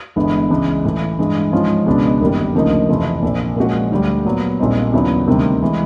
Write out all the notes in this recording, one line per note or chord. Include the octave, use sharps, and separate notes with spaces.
G1 G2 E3 G#3 B3
C#2 C#3 E3 G#3
A2 E3 A3
G2 E3 G#3
G#2 F3 G#3 C#4 F4
C#2 B2 G#3 B3 D4
G1 F#2 D#3 G3 A#3
D2 C#3 F3 A#3 D#4
F2 C3 E3
A#1 A#2 F3
A#2 F3 G#3 C#4 F#4
D2 D3 G3
A#2 F#3 B3
A#1 A#2 G3 C4 D#4
D#2 C#3 F#3 B3 E4
D2 C3 D#3 G3
E3 G#3